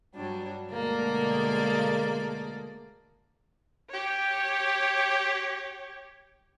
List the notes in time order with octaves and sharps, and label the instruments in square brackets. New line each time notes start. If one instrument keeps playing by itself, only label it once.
[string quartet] G2 F#3 G3 D4
D2 B2 D3 G#3 A#3 D5
[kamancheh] G4 C#5